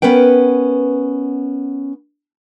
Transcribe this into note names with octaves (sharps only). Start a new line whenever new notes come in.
B3 C#4 A#4 B4 G5